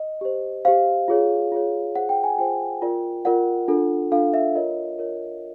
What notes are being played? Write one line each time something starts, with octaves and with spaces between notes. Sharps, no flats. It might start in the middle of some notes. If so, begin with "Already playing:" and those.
Already playing: D#5
G4 C5
G4 C5 F5
F4 G#4 C#5
F4 G#4 C#5
F4 G#4 C5 F#5
G5
G#5
F4 G#4 C5 G5
F4 A#4 D5
F4 A#4 D5 F#5
D4 F4 A4
D4 F4 A4 F5
E5
F4 A#4 C#5 D#5
F4 A#4 C#5